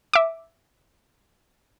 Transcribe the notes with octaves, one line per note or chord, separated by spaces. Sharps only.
E5 D6